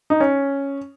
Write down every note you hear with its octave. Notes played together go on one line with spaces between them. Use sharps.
D#4
C#4